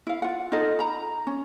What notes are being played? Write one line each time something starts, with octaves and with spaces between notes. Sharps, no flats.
E4 F5
F4 F#5
D#4 F4 A4 D#5
A#5 B5
C#4